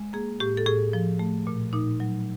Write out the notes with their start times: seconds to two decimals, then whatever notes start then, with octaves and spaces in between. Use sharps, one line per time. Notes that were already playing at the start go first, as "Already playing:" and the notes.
Already playing: G#3
0.13 A#3 G#4
0.40 A2 G4
0.57 A4
0.66 A2 G#4
0.93 F3
1.19 A3
1.47 A#2
1.73 A#2 D#4
2.00 F#3